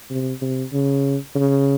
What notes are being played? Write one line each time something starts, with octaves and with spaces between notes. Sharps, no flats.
C3
C3
C#3
C#3